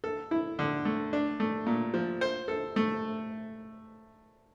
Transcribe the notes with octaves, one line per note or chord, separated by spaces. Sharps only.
A4
E4
D3
A3
D4
A3
A#2
F3
C5
A4
A3